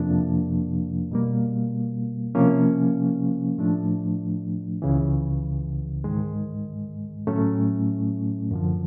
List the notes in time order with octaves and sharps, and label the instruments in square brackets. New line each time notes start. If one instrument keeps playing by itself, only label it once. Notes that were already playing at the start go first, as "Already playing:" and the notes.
Already playing: [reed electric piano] F2 C3 F3 A#3 D4
B2 G3 A#3
C3 F3 A#3 C#4
A2 F3 A3 D4
C#2 C#3 E3
G#2 D#3 G#3
A2 F#3 A3 C#4
F#2 D3 F3